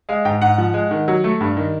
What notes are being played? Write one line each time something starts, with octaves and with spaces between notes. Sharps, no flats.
G#3 F5
G#2 G5
G#2 F#5
F3
G#3
D#3
F#3
A3
G2
D#3